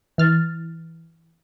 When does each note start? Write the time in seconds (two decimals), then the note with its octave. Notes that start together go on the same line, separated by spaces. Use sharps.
0.18 E3 F6 A6